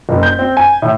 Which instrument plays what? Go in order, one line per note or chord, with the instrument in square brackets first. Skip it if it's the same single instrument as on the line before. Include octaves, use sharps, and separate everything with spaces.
[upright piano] F#1
G6
C4
G#5
A2